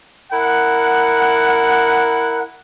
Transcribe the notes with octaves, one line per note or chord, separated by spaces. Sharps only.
E4 A#4 F#5